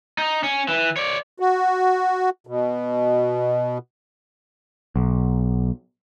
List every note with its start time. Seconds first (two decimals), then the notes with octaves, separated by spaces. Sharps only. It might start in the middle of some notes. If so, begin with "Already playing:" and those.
0.18 D#4
0.44 C#4
0.68 E3
0.96 C#5 D5
1.40 F#4
2.47 B2
4.96 B1